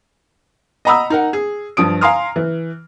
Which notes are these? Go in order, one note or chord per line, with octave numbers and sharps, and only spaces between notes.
D#5 F#5 A#5 B5 D#6 E6
D#4 A#4 F#5
G#4
G2 F3 D#6 D7
F5 G#5 A#5 C6 D#6 F6
E3